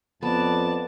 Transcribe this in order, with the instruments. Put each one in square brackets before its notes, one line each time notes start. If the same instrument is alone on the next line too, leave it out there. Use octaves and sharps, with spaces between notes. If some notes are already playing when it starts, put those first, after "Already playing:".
[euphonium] F2 [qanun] B3 [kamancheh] D5 A5